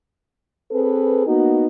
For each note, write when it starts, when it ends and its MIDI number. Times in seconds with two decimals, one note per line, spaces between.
0.71 1.23 60
0.71 1.23 68
0.71 1.23 69
0.71 1.23 71
1.27 1.67 58
1.27 1.67 59
1.27 1.67 63
1.27 1.67 66